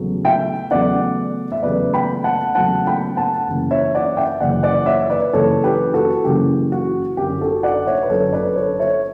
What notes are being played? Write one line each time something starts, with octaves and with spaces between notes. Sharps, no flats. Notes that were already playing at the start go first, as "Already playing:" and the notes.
Already playing: E2 C#3 F#3 A3
E5 G5
E2 C#3 F#3 A3 D5 F#5
E5
E2 C#3 F#3 A3 B4 D5
G5 B5
F#5 A5
E2 C#3 F#3 A3 F#5 A5
G5 B5
F#5 A5
F#1 F#2 C#3 E3
C#5 E5
D5 F#5
E5 G5
F#1 F#2 C#3 E3 D5 F#5
D5 F#5
C#5 E5
B4 D5
F#1 F#2 C#3 E3 A4 C#5
G4 B4
F#4 A4
F#1 F#2 C#3 E3 G4
F#4
G1 F#2 D3 F#3 G4
F#4 A4
D5 F#5
C#5 E5
B4
G1 F#2 D3 F#3 A4 C#5
B4 D5
A4 C#5
C#5 E5